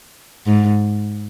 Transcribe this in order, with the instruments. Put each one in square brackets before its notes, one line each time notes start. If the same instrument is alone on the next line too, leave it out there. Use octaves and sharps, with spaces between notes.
[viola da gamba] G#2